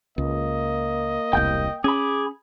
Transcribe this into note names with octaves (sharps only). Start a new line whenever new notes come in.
C#2 A#3 D#5
E1 C2 G5 G6
C#4 G#4 B5 D6